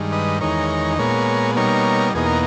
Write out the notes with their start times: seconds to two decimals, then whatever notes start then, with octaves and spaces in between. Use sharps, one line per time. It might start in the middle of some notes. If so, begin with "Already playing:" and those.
Already playing: G2 D#3 G#3
0.12 B4 D#5
0.41 E2 D#3 G#3 D#4 A#4 C#5
0.99 A#2 G#3 B3 A#4 C#5
1.56 B2 G3 A#3 D#4 A#4 C#5
2.15 E2 B2 A#3 D#4 G#4
2.26 A#4